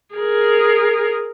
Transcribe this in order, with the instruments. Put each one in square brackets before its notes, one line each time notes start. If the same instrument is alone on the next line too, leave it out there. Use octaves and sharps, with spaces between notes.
[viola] G#4 A#4